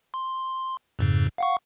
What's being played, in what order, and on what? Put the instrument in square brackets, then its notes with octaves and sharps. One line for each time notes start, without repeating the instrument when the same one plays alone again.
[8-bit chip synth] C6
F2 G#2 C#3
F5 F#5 C#6